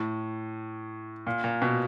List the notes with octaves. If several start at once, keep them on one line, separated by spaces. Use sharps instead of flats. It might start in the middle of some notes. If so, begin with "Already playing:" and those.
Already playing: A2
A#2
A#2
B2